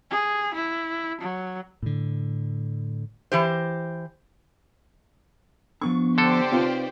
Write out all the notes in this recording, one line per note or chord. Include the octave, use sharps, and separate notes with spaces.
G#4
E4
F#3
A2 D3
E3 G4 C5
F3 B3 D4 C#6
D3 G4 A4 C5 D5
C3 D#4 F4 B4 C#5